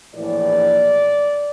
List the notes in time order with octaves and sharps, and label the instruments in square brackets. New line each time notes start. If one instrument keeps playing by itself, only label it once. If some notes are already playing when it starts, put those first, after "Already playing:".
[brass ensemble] A#1 A2 E3 D5